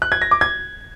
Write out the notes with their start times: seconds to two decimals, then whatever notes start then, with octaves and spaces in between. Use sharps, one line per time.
0.02 F#6
0.12 G#6
0.22 A#6
0.31 D6
0.41 G#6